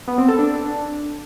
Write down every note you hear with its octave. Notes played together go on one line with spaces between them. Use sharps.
B3
C4
A4
D4